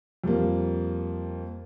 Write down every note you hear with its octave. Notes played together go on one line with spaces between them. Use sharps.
F2 G3 A#3